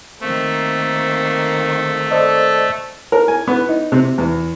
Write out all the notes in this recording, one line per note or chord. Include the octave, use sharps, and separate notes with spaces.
D#3 A3 A#3 C4
A4 C5 D5 D#5
A#4
G#5
B3
D#4
C3
E2